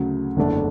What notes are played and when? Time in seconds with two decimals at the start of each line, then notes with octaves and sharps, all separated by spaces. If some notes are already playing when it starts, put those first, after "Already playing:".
Already playing: D2 C#3 F#3
0.37 F#1 E2 D3 A3 D4